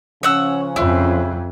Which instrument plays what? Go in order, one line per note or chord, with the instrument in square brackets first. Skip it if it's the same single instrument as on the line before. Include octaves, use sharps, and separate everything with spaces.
[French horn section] C#3 F3 C#4 [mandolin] C#5 F#5 E6
[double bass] F2 [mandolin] E4